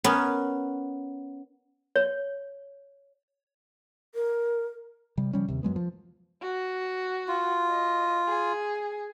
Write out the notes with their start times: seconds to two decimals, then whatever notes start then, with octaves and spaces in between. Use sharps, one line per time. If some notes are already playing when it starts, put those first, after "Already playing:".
0.04 B3 C#4 A#4
1.96 C#5
4.15 A#4
5.17 C3 G3
5.33 C#3 F3 G3 C#4
5.48 D#2 C3
5.63 F#2 F#3 G#3 B3
5.76 F3
6.42 F#4
7.28 F4
7.70 D#5
8.28 G#4